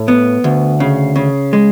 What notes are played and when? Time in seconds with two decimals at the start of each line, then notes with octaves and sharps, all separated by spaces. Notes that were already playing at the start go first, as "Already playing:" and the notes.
Already playing: A2
0.08 B3
0.44 D2
0.80 C#3
1.16 C#3
1.53 G#3